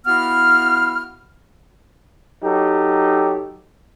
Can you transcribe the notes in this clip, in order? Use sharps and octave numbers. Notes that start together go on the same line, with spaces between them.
B3 E4 F#4 F5 F6
F#3 D#4 G4 A4